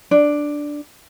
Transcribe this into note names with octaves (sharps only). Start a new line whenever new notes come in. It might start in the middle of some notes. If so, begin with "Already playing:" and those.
D4